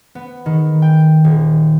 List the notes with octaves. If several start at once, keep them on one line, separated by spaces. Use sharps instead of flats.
B3
D#3
G5
D#1